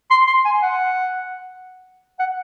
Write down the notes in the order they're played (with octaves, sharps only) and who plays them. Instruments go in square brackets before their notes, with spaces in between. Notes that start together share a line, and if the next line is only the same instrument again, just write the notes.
[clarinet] C6
C6
G#5
F#5
F#5